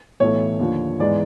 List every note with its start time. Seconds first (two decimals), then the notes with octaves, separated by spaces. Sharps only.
0.20 B1 A2 E3 A3 C#5
0.60 D#2 D3 F3
1.00 G#2 E3 G#3 B3 D5